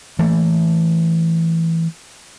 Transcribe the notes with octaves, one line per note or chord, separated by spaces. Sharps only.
E3 A3 A#3